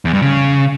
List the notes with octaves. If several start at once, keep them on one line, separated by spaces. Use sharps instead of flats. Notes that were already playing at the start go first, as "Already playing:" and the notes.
E2
G2
C#3